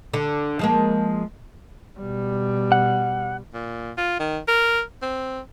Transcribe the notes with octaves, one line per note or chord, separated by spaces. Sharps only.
D3
F3 G#3 A#3
B2 G3
F#5
A#2
F4
D#3
A#4
C4